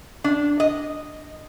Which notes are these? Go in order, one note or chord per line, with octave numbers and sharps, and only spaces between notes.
D4
D#5